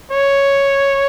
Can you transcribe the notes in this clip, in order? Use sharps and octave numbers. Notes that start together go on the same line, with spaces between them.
C#5